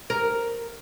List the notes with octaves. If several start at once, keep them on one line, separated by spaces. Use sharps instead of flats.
A#4